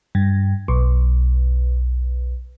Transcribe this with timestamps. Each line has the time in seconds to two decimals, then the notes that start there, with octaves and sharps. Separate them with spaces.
0.15 G2
0.68 B1